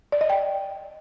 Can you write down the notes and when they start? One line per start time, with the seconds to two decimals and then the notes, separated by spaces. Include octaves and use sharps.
0.12 D5
0.21 D#5
0.30 G5